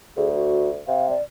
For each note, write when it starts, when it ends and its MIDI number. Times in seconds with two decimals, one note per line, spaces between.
0.17 0.79 38
0.17 0.28 68
0.35 0.70 66
0.87 1.14 48
0.87 1.07 77
1.10 1.23 74